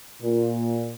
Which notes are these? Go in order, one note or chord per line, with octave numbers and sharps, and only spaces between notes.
A#2